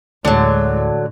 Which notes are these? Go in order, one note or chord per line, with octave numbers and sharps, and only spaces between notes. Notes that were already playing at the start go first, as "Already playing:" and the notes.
D2 A2 D3 F#3 G#3